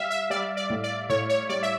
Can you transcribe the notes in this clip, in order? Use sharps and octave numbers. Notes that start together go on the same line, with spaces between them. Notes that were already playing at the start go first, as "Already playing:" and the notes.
Already playing: G3 E5 F5
E5
G3 D5
D5
A2
D5
A2 C#5
C#5
G3 D5
E5